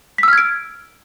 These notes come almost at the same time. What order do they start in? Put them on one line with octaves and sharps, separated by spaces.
B6 E6 F6 G#6 D7